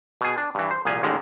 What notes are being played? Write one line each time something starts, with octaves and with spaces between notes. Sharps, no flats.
B2 G#4
D4
G2 E3
C5
C2 A#2 F3 G#4 G#5
A1 D#2 D3 D#3 G#3